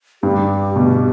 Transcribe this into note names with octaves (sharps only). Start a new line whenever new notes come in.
G2 G4
B2